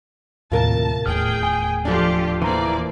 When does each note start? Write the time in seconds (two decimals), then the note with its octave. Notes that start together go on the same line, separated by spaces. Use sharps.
0.52 D#2 A2 C3 F4 A#4 A5
1.06 D#1 E2 A2 G#4 G5 F6
1.43 G#5
1.85 F3 D4 F4 G4 A4 D5
2.42 E3 F3 A#3 D5 G#5 A#5